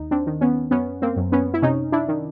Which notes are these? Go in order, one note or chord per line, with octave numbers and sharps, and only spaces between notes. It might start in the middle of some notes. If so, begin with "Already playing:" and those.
Already playing: D#2 D#4
C4 D4
D#3
B3 C#4
F#2 B3 C#4
A#3 C4
F#2
B3 C#4
E4
C3 C#4 D#4
D4 E4
D#3